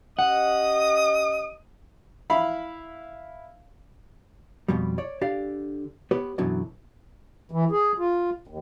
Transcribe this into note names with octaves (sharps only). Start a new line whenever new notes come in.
C#4 G4 D#5 F#5 D#6
E4 F5 B5
F2 B2 G3
C#5 D5
D3 G4 D5 F5
B3 G4 B4 C#5
F#2 B2 D3 E3 F#3
E3
G#4
F4
D#2